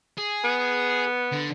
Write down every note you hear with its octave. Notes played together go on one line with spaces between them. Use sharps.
G#4
B3
D3